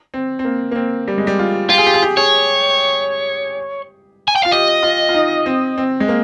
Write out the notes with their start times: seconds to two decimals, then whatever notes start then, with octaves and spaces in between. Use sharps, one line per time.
0.14 C4
0.39 C4
0.45 A#3
0.72 A#3
0.76 C4
1.08 G3
1.18 G#3
1.27 G3
1.39 F4
1.70 F4 G4
1.78 G#4
1.86 G4
1.94 G#4
2.03 G4
2.17 G#4 C#5
4.28 G#5
4.36 G5
4.43 F4 F5
4.52 G4 D#5
4.83 F4
5.09 F4
5.15 D#4
5.46 C4
5.78 C4
6.00 G#3
6.08 A#3